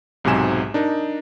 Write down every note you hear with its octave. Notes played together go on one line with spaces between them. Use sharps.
B1 G#2 C3 F#3 G#5 E7
D4 D#4 A#4